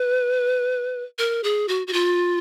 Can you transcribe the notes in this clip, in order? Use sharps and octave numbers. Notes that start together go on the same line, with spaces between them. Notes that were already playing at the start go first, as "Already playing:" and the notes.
Already playing: B4
A#4
G#4
F#4
F#4
F4